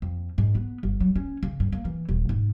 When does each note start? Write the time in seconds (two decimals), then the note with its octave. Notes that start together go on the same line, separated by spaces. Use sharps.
0.02 F2
0.38 G#2
0.55 B3
0.83 G1
1.00 F#3
1.16 C#4
1.43 C#3
1.60 G2
1.72 A#3
1.85 E3
2.09 D#1
2.29 G#2